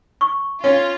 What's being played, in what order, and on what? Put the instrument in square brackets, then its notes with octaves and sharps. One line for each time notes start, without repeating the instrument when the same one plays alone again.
[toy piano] C#6
[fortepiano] C#4 [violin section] F4